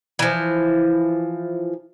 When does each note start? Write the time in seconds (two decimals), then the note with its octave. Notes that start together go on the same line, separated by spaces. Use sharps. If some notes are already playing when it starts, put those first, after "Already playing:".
0.19 E3 F3